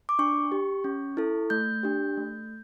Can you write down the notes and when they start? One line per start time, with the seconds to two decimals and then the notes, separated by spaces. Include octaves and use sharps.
0.09 D6
0.19 D4 C#6
0.52 G4
0.84 C#4
1.17 E4 A4
1.50 A3 G6
1.83 D4 G4
2.17 A3